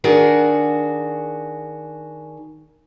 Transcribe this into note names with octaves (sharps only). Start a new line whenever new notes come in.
D#3 D4 F#4 G#4